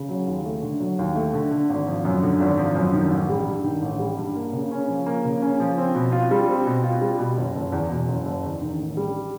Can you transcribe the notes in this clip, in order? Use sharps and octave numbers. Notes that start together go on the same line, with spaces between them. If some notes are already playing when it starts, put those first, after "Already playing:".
Already playing: C#3
F#3
D#2
A3
D3
F#3
D#2
A3
D3
D3
G#1
F3
F#2
D3
G#1
F3
F#2
D#3
A1
G3
G2
D#3
A1
G3
G2
A#3
C#3
C#4
F3
A#3
C#3
C#4
F3
C4
B2
F4
G3
C4
B2
F4
G3
B2
F#1
F#1
E2
B2
F#1
F#1
E2
D#3
A1
G3